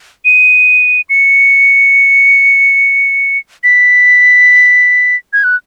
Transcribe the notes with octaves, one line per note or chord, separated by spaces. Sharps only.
D#7
C#7
B6
G#6
F#6